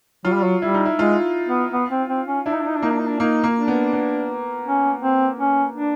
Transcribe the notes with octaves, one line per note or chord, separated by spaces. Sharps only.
F#3 F4
G3
F#3
G3 E4
D#4
E4
G#3 F4
B3
B3
C4
C4
C#4
D4 E4
D#4
D4
D#4
D4
A#3 D#4
D4
D#4
D4
A#3 D#4
A#3
D4
B3
B3
C#4
C4
C#4
D4